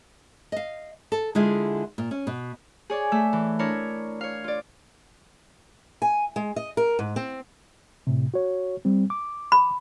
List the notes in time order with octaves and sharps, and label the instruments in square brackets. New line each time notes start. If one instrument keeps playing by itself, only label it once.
[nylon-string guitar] D#5 F5
A4
D3 G#3 E4 F4 G#4
A#2
C#4
B2
[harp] G#4 C#5 D5
A3 E5
E3
D4 E4 A#4 C#5
C#5 F5
F4 D5
[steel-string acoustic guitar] G#5
G#3
D#5
A#4
G#2
C4
[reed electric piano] A2 C3
F#4 C#5
G3 C4
D6
[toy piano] B5